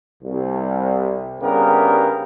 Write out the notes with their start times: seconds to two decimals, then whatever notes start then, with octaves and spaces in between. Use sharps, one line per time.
0.23 C2
1.41 C2 G2 C#3 B3 G4 A#4